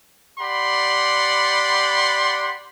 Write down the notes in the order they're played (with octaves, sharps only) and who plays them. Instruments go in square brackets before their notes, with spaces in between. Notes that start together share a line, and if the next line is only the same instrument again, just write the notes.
[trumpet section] G4 D5 F#5 B5 C6